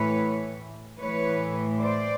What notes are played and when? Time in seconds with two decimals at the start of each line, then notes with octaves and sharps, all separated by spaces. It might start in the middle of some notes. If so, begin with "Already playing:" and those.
Already playing: A2 E3 B4 C#5
1.00 A2 E3 B4 C#5
1.80 C5 D5